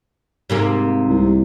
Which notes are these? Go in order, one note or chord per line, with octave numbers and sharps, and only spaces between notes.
G#2 C3 A#3
C2